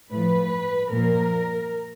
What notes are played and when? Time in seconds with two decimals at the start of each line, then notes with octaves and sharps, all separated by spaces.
0.10 A2 F3 B4
0.92 A#2 F3 A#4